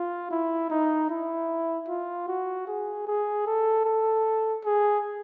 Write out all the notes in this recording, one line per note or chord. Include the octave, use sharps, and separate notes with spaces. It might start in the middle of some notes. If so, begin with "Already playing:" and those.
Already playing: F4
E4
D#4
E4
F4
F#4
G#4
G#4
A4
A4
G#4